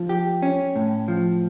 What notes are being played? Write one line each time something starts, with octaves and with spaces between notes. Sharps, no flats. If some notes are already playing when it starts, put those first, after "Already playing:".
Already playing: F3
G4
C#4
A2
F3